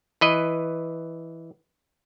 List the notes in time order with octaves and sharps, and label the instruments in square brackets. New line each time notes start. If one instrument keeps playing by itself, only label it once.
[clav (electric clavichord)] E3 B4 D#5